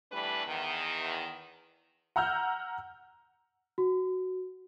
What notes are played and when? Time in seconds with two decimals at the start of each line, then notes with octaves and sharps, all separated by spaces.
0.12 E3 G3 A3 D4 B4
0.46 E2 D#3
2.16 F#5 A#5 E6 F6 G6
3.78 F#4